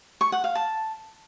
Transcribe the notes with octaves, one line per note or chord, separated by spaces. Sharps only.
C#6
F#5
F5
A5